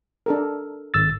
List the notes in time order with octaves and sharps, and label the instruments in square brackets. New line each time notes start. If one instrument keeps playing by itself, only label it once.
[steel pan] D4 A4 A#4
[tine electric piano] G#1 E6 A6